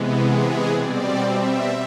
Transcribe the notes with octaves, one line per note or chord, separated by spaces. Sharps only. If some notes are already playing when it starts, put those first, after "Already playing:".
Already playing: C3 E3 G#3 B3
G#4
B2 G3 C4 D5
E5